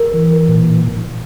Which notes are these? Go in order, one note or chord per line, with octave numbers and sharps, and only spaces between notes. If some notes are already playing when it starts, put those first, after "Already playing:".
Already playing: A#4
E3
A#2